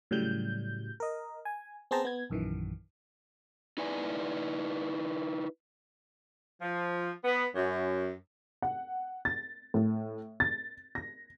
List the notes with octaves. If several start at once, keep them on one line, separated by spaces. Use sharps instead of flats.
A2 C#3 F#3 G3 G6
A#4 D#5
G#5
B3 C4 G#4 C5 A5 A#5
B3 G#6
A#1 F#2 D#3 E3
D#4 E4 B4 D5 G#5
F3
B3
F#2
F#5
A6
A2
A6
A#6